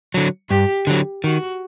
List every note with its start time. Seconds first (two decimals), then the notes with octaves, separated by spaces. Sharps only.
0.14 D3 F#3
0.50 G2 G4
0.87 D3 F#3
1.24 D#3 F#4